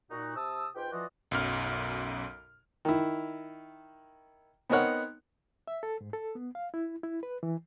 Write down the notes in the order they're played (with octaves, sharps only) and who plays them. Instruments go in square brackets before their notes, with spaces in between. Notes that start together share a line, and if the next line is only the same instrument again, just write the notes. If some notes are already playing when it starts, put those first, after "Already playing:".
[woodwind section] A#2 D#4 F#4
C3 A5 D#6 E6
G#2 F4 B4 G5
E3 F3 F4 F#4 D5 D#5
[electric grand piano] B1 F#2 F6
[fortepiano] D#3 E4
B3 C4 D#4 A#4 C#5 F#5
[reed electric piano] E5
A4
G#2
A4
B3
F5
E4
E4
B4
E3